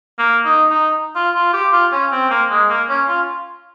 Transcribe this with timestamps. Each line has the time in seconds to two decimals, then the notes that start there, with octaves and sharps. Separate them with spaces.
0.19 A#3
0.45 D#4
0.70 D#4
1.15 F4
1.35 F4
1.53 G4
1.73 F4
1.92 C#4
2.12 C4
2.30 A#3
2.50 G#3
2.69 A#3
2.89 C#4
3.08 F4